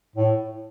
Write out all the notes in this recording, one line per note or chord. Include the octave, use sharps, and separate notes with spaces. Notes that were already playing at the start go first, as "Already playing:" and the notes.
A2